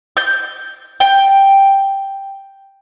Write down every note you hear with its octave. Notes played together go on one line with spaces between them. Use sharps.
G6
G5